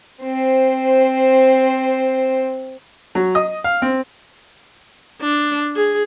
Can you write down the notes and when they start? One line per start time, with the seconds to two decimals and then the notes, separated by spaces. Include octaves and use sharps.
0.22 C4 C5
3.15 F#3
3.35 D#5
3.64 F5
3.82 C4
5.21 D4
5.76 G#4